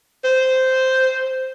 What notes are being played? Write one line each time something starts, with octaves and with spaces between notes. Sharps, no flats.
C5